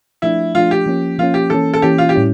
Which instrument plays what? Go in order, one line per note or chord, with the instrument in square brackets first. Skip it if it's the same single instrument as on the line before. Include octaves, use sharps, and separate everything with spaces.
[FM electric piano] F3 A3 D4 [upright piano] E4
[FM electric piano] F3 A3 D4 [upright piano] F4
[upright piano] G4
[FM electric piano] F3 A#3 C#4
[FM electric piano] F3 A#3 C#4 [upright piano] F4
[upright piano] G4
[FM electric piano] E3 A#3 C#4 [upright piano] A4
[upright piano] A4
[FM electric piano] E3 A#3 C#4 [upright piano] G4
[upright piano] F4
G4
[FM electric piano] A2 G3 C#4 E4